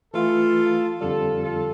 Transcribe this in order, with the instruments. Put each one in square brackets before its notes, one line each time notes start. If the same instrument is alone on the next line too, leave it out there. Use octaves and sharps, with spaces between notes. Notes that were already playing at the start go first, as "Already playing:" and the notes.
[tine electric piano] E3 A3 E4 [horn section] F4 A4
[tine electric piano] F2 D3 G3 [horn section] F4 A4
[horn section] F4 A4